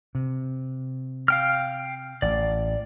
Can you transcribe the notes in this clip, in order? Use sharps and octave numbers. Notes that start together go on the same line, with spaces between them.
C3
F5 G5 F6
A1 D5